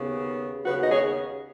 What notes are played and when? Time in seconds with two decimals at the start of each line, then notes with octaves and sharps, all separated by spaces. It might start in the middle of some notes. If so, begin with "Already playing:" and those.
Already playing: D#2 C#3 B3
0.65 D#2 C#3 B3 F#4 B4
0.82 D#5
0.90 G#4 C#5